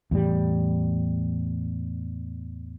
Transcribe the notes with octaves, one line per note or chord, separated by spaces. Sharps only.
E2 A2 G3